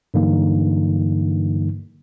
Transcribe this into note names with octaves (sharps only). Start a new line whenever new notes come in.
G2 D3 E3 F#3 A#3 D#4